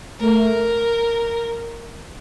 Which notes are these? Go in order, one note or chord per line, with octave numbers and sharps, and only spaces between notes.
A3 A#4